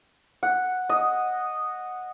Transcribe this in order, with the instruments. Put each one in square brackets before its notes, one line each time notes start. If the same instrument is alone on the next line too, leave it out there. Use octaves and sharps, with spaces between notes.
[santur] F#5
D#5